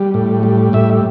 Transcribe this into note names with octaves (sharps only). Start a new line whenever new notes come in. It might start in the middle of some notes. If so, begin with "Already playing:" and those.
Already playing: G3
A2
G3
A2 E5